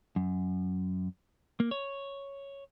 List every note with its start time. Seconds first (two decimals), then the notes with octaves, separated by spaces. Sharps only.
0.16 F#2
1.60 A#3
1.71 C#5